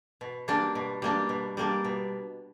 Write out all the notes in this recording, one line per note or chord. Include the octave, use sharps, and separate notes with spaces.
B2
G3 A#3 D4
B2
G3 A#3 D4
B2
G3 A#3 D4
B2